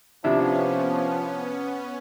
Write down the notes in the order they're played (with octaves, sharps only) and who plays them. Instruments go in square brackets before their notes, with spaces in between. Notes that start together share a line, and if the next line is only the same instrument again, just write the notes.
[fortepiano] C3 D4 E4 [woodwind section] F3 [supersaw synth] B3 C#4